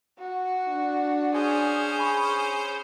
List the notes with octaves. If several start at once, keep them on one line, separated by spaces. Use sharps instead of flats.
F#4
D4
C#4 G#4 C5 G#5
G#5 B5 C#6